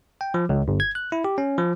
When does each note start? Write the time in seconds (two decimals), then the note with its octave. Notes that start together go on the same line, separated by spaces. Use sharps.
0.21 G5
0.34 F3
0.49 C#2
0.68 G1
0.80 G#6
0.95 F#6
1.12 E4
1.24 G4
1.38 C#4
1.58 F3